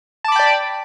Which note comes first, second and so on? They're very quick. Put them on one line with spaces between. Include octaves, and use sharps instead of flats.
A5 D6 B5 G5 D5